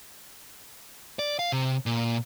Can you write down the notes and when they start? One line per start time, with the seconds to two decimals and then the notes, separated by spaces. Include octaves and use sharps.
1.19 D5
1.39 F5
1.52 C3
1.86 A#2